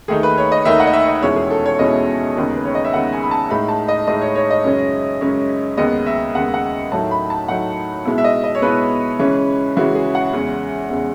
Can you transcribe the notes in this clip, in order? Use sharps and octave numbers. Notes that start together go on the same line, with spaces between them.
D#2 D#3 A3 D#4 G#4
B4
C#5
D#5
D#2 D#3 A3 D#4 E5
F#5
D#5
E5
D#5
E2 B2 G#3 C#4 E4 C#5
G#4
A4
C#5
E2 B2 G#3 C#4 E4 D#5
D#2 C#3 G#3 B3 D#4
B4
C#5
D#5
E5
D#2 C#3 G#3 B3 D#4 F#5
G#5
B5
A5
A2 G#3 D#4 B5
A5
D#5
A2 G#3 D#4 D#5
C#5
C#5
D#5
F#2 C#3 G#3 C#4
F#2 C#3 G#3 C#4
D#2 C#3 G#3 B3 D#5
E5
D#2 C#3 G#3 B3 F#5
F#5
A2 F#3 A3 D#4 A5
B5
A5
A2 F#3 A3 D#4 F#5
B2 G#3 B3 E4
E5
D#5
D#5
C#5
B2 G#3 B3 E4 B4
C#3 E3 G#3 C#4
C#3 E3 G#3 C#4 F#4
G#4
F#5
E2 C#3 G#3
E2 C#3 G#3